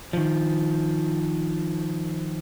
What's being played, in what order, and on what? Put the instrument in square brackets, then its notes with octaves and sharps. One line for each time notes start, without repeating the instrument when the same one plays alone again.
[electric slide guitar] D#3 F3